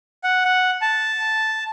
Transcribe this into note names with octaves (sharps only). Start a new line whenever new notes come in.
F#5
F#5
A5